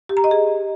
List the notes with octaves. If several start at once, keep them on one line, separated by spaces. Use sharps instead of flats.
G4
A#5
D#5
G#4